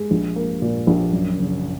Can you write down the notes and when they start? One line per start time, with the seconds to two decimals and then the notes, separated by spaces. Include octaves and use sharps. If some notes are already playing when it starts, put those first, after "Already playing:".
Already playing: G#3
0.11 A#1
0.36 A#3
0.62 A#2
0.87 A#1
1.13 F#2
1.38 F#1